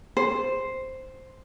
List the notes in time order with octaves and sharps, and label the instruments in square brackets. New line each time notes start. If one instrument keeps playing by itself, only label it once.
[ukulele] C5